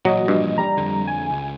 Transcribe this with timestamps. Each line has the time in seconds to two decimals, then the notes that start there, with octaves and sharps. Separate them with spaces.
0.05 A1 A#2 F#3 F#4 D#5
0.28 A1 G2 A#2 F3
0.58 G3 A#5
0.77 F2 D3
1.07 G#5
1.30 C#2